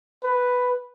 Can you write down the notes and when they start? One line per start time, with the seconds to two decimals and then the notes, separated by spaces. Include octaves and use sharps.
0.24 B4